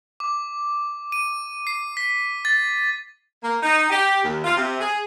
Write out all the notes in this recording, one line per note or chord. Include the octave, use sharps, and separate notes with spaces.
D6
D#7
C7
B6
A6
A#3
D#4
G4
D#2
F4
C3
G#4